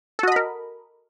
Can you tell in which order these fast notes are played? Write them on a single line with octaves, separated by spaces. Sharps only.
A4 F#4 D#5 B5 A#4